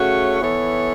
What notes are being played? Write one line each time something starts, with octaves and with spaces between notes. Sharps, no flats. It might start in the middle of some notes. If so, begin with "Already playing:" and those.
Already playing: C#3 A3 F#4 C#5
E3 B3 A4 C#5